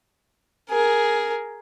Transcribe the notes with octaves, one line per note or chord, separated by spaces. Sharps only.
G#4 A#4